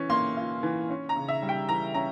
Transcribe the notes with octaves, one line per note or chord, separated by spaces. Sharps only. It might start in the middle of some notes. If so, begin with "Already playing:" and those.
Already playing: E3 C#4
A#3 C6
F4
E3
C#4
A#5
C#3
E5
G3
G5
E3 A#5
C#4 A#5